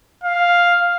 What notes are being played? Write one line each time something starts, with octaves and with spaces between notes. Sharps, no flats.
F5